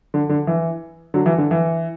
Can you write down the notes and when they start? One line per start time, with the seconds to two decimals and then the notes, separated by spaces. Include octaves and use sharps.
0.14 D3
0.29 D3
0.47 E3
1.14 D3 F#3
1.26 E3
1.38 D3
1.51 E3